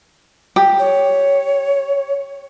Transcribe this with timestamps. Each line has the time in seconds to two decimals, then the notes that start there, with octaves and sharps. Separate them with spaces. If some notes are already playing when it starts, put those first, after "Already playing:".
0.56 G4
0.79 C#5